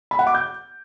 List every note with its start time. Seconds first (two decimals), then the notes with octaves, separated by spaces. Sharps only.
0.11 B5
0.19 F#5
0.27 D6
0.35 G6